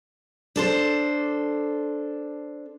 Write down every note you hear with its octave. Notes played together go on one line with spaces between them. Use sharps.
D4 A4 C5